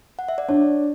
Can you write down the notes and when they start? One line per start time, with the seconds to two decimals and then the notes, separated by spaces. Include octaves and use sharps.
0.19 F#5
0.28 E5
0.38 D5
0.48 D4 C#5